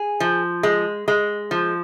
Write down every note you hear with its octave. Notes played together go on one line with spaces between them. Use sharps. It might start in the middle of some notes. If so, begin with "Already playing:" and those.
Already playing: G#4
F3
G#3
G#3
F3